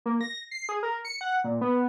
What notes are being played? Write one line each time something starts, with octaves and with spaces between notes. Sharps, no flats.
A#3
A#6
C7
G#4
A#4
C#7
F#5
A#2
B3